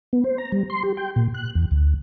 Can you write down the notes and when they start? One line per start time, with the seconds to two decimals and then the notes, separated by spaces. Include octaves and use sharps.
0.13 B3
0.24 C5
0.38 A#5
0.52 G3
0.70 C6
0.83 G4
0.97 G5
1.16 A#2
1.34 F#6
1.55 E2
1.71 D2